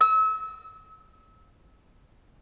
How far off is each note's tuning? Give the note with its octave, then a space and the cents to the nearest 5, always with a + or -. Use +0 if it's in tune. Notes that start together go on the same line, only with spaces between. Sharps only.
E6 -35